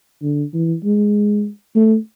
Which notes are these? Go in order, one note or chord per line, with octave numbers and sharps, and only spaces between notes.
D3
E3
G#3
A3